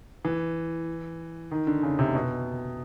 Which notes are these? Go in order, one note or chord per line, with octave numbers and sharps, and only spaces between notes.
E3
D#3
D3
C#3
C3
B2